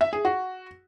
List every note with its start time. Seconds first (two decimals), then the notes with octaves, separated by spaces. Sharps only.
0.01 E5
0.13 G#4
0.25 F#4